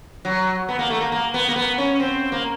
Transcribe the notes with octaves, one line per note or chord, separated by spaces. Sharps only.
F#3
B3
A#3
A3
A#3
A#3
B3
A#3
B3
C#4
C4
A#3